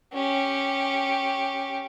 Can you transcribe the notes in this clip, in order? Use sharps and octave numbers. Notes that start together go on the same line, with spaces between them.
C#4 G4